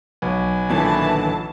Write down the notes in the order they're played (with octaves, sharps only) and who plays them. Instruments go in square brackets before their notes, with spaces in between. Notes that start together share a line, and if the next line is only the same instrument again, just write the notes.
[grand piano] B1 [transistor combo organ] B4 G#5
[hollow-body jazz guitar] D#2 A#2 D3 [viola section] E3 A5